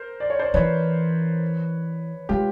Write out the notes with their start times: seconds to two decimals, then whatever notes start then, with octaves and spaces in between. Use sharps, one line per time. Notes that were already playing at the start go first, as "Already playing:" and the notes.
Already playing: A#4 C5
0.20 D5
0.30 C#5
0.39 C5 D5
0.54 E3 B4 C#5
2.29 G#3 F4 G4